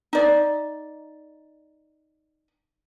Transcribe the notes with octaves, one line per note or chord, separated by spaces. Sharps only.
D#4 D5